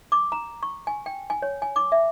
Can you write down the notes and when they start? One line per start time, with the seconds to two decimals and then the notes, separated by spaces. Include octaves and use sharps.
0.12 D6
0.32 A#5
0.63 C#6
0.87 G#5
1.06 G5
1.30 G#5
1.42 C#5
1.62 G#5
1.76 D6
1.92 E5